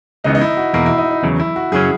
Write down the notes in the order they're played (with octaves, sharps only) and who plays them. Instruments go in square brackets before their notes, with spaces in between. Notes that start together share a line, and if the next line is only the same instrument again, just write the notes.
[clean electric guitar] C#2 C#3 E3 B3 [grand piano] D#4
[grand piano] D#4
E4
F#4
[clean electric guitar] E2 B2 A#3 [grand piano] E4
[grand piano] E4
D#4
D#4
[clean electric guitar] E2 C#3 F#3
[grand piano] E4
F#4
[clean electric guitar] F#2 C#3 F#3 C#4 [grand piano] G#4